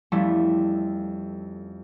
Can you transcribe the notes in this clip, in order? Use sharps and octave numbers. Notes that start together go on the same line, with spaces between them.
F2 F3 G3 A3 C#4 E4